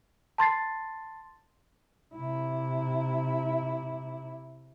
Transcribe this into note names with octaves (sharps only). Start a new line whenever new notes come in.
A5 C6 A6 C7
C3 E4